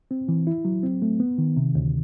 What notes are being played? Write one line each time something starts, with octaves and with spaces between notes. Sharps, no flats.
C4
E3
E4
F#3
C4
A3
B3
D#3
C3
D2